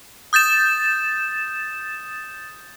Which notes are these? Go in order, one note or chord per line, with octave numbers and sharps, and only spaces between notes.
D#6 G6 A6 E7